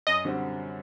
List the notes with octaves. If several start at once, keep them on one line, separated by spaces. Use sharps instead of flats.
F#2 D#5
D3 G3 C4 F#4